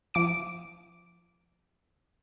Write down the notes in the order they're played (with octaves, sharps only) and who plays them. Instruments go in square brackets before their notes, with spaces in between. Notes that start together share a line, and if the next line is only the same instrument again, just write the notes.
[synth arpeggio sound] F3 D6 D7